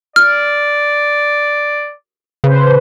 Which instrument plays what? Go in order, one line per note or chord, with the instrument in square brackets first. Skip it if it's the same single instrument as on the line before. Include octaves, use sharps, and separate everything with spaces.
[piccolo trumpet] D5 [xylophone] F6
[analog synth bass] C#3 [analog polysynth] B4 C5